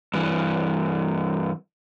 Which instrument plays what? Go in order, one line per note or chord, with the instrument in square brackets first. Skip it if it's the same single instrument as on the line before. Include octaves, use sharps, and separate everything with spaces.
[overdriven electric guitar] G2 E3